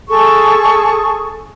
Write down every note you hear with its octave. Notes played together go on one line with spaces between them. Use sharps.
G#4 A4 C#6